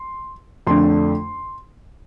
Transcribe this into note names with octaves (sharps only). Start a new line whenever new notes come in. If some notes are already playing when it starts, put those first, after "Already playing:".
Already playing: C6
F2 D3 A3 D4 C6